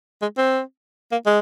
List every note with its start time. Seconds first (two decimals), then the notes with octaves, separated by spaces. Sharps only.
0.21 G#3
0.38 C4
1.12 A#3
1.26 G#3